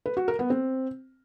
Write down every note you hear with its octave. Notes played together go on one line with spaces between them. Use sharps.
B4
F#4
A#4
B3
C4